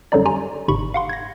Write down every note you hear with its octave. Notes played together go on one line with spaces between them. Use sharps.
F#2 D3 F#3 G3 D#4 D5
G4 G#5 A#5 C6
G1 G#2 C3 B5 C#6
F5 F#5 C6
G#6 A#6